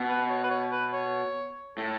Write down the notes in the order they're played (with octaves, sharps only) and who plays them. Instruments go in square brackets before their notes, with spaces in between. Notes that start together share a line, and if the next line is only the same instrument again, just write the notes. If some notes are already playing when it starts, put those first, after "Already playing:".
Already playing: [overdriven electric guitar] B2
[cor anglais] B4
C#5
B4
C#5
B4
C#5
[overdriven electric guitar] A2 [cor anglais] A4